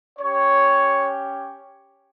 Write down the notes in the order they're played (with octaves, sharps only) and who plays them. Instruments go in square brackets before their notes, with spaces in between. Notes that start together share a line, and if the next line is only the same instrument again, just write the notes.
[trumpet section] C#4 G4 C#5